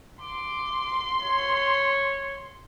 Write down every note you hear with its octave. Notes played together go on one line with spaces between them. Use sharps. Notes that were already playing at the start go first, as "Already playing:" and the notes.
C6 D6
C#5